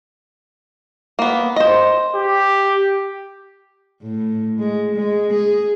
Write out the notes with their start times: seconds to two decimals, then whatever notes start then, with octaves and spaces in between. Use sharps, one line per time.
1.19 A#3 B3
1.56 C5 D#5
2.15 G4
4.03 A2
4.59 G#3
4.95 G#3
5.33 G#4